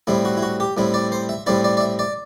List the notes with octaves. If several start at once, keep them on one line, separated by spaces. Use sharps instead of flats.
A2 G3 C4 E4
F#4
E4
F#4
G4
A2 G3 C4 E4
D5
C5
E5
A2 G3 C4 E4 D5
D5
D5
E5
D5